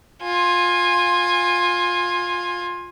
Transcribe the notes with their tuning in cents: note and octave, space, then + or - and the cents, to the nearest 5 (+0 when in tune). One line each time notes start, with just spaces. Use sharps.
F4 +15 G#5 -15